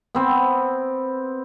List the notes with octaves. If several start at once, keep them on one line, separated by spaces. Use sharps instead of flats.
B3 C4